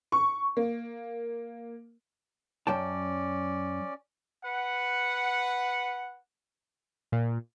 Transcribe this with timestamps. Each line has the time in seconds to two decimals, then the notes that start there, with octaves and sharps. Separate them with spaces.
0.12 C#6
0.57 A#3
2.67 F#2 C#4 D5 G5 A5
4.44 B4 F#5
7.12 A#2